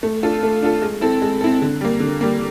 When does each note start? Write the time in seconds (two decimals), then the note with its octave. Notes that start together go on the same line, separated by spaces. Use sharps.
0.03 A3
0.23 D4 F4 A4
0.43 A3
0.62 D4 F4 A4
0.82 G#3
1.01 C4 E4 A4
1.22 G#3
1.41 C4 E4 A4
1.62 D3
1.81 G3 A#3
2.00 D3
2.21 G3 A#3